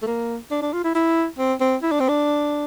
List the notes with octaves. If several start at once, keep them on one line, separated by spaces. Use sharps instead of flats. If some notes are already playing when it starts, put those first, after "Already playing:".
A3
A#3
D4
D4
F4
E4
E4
C4
C4
E4
D4
C4
D4